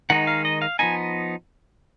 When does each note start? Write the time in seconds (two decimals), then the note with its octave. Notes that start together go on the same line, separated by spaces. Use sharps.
0.10 D#3 G#3 D#4 F#5
0.27 F5
0.45 D#5
0.62 F5
0.79 F3 B3 D#4 G#5